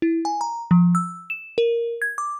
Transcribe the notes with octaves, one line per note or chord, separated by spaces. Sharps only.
E4
G#5
A#5
F3
E6
E7
A#4
G#6
D6